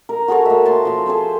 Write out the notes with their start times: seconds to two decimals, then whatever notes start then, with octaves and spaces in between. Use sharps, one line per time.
0.09 A#4
0.28 F#4 G#4 A4 C#5
0.46 A#3 E5
0.65 A5 C6
0.85 F3 E5 F5
1.06 G#4 A4 C5 C6